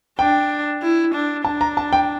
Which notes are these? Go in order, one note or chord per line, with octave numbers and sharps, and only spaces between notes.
D4 G5
E4
D4
D4 A5
A#5
A5
G5